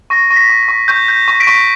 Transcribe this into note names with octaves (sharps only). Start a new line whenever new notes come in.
C#6 A#6
C#6 A#6
B6
C#6
B6
C#6
C#6 G6
G6
C#6
B6 D7
C#6